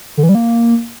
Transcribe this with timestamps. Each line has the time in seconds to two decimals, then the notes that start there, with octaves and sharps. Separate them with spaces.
0.17 D3
0.23 E3
0.29 G3
0.35 A#3